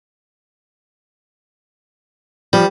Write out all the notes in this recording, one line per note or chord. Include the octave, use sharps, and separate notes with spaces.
F3 G3